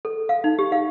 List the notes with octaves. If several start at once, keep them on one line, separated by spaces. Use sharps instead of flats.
A4
F5
D#4
G4
F5